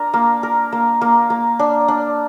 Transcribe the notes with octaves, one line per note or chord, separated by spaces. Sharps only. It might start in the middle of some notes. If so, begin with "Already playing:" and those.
Already playing: D4 A#4
A#3
A#4
A#3
A#3
A#3
D4
D4